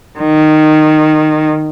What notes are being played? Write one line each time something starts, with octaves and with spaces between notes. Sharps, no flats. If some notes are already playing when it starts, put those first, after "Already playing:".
D#3